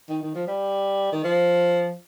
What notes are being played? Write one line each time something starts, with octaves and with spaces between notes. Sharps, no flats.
D#3
D#3
F3
G3
D#3
F3